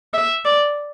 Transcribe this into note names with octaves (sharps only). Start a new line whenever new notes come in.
E5
D5